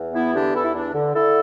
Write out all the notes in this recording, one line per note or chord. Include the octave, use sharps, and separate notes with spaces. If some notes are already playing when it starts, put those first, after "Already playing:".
Already playing: E2
E3 B3 E4
D3 D4 G4
E2 E4 A4
E4
E2 D4
D3
D3 E4 A4